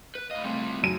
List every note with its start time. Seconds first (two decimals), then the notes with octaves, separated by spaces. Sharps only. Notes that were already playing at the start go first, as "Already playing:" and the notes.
0.15 B4
0.31 A2 D#5 F5 B5
0.44 C#3 G3 A3 C4 G5
0.60 F3
0.83 F#2 C4 D#4 E4 D#7